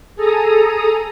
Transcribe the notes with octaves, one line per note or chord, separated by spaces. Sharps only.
G#4 A4 A#5 D#6